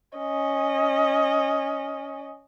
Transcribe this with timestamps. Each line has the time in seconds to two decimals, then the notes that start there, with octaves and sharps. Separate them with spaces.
0.18 C#4 D#5